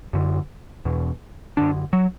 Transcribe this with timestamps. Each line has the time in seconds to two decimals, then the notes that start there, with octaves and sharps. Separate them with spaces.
0.13 F#2 D3
0.85 E2 B2
1.57 F#2 D3 D4
1.93 F#3